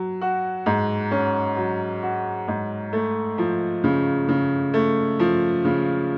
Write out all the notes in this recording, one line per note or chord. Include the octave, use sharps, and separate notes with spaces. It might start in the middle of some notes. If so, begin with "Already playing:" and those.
Already playing: F#3
F#4
G#2
C#4
F#3
F#4
G#2
A3
F3
C#3
C#3
A3
F3
C#3